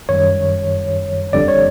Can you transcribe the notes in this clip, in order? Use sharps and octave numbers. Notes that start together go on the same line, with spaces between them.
F#2 D#3 G3 C#5
G1 F2 D3 G3 D5
C#5